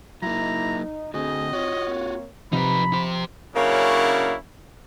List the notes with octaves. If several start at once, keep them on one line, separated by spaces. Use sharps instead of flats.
F#3 A#3 D#4 E4 A#5
D3 C4 F#4 G#4 D#5
F4 F#4 C#5
A#3 C4
C3 F3 D#4 B4 F5 A#5 B5
G4 C5
C#3 F#3 A#3 C#4 D4 E4